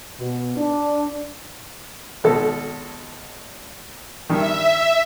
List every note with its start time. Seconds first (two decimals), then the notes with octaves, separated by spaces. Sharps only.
0.18 B2
0.56 D4
2.24 G#1 B2 A4
4.29 G2 D#3 E5